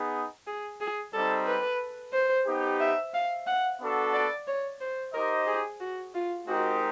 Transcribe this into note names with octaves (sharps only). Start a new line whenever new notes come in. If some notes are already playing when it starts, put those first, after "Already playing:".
Already playing: B3 D#4 G#4
G#4
G#4
G3 C4 D#4 A4
B4
C5
B3 D#4 G4
E5
F5
F#5
B3 D4 F#4 A4
D5
C#5
C5
D#4 G4 A#4 C5 D#5
G#4
F#4
F4
G#3 C4 D#4 F#4 G4 A#4